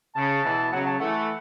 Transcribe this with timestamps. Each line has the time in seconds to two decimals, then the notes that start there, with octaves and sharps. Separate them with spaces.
0.15 C#3 A5
0.43 B2 E3
0.72 C#3 F#3 F#5
0.86 A5
0.99 E3 A3 F#5